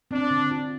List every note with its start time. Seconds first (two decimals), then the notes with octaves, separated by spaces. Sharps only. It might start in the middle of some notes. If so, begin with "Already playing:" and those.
0.10 C4 D4
0.30 D3
0.51 F4